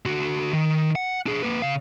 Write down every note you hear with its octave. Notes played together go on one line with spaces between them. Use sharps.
D3 F#4
D#3
F#5
D4 G#4
A#3 B4
C#3 F5